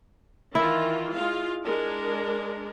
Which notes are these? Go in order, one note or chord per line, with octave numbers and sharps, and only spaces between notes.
D#3 E3 E4 F4
G#3 F4 F5
G#3 D4 A#4